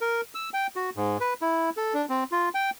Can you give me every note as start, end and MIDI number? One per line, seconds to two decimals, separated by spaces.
0.01 0.21 70
0.35 0.50 88
0.54 0.67 79
0.76 0.90 66
0.97 1.18 44
1.21 1.34 71
1.42 1.70 64
1.77 1.94 69
1.94 2.05 62
2.09 2.24 60
2.32 2.49 65
2.54 2.70 79